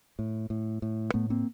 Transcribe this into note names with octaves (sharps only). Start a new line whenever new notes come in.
A2
A2
A2
A2 A3 B3
A#3 C4